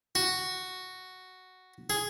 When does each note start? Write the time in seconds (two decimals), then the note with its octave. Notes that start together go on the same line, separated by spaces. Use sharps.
0.15 F#4
1.90 G#4